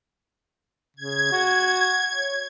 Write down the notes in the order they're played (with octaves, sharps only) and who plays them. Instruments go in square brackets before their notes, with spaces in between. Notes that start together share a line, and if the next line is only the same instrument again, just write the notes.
[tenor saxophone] C#3 [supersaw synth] G#6
[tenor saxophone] F#4
C#5